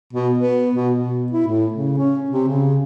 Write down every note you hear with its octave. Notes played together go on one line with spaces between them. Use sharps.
B2
B3
B2
B2
E4
A2
C#3
C#4
C3
C#3